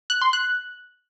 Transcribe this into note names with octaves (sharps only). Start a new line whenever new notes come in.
F#6
C6
F#6